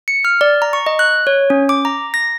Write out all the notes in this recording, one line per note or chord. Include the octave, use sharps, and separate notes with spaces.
C#7
F6
D5
A#5
C#6
D#5
F#6
C#5
C#4
D6
A#5
A#6